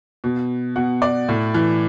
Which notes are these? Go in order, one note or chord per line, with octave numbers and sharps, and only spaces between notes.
B2
B2 F#5
D5
A2
E3